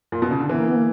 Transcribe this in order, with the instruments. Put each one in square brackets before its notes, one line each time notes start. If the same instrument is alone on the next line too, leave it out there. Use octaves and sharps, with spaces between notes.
[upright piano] A#2
B2
C#3
D3
[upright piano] E3 [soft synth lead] B3
[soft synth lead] A#3
B3
A#3